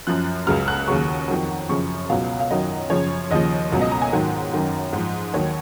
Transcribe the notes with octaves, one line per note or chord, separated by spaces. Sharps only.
F#2 F3 F#6
C#2 C#3 F#3 F6
F#6
D#2 C#3 F#3 C#6
F2 D#3 F#3
F#2 C#3 F3 C#6
C#2 B2 F#3 F5
F5
F#2 D#3 F#3 D#5
F#2 C#3 F3 C#5
D#2 C#3 F3 D#5
C#2 B2 F#3
D#5
A#5
G#5
G#2 D#3 F#3
F#2 D#3 F#3
G#2
F3
D#2 D#3 F#3 C#5